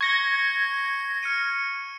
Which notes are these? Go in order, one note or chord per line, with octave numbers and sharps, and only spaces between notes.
C#6 G#6 A#6 C#7 G7
F6 C#7 D#7